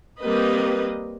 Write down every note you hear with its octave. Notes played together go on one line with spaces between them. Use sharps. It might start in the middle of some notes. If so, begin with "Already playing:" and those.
G3 A#3 C4 B4 D#5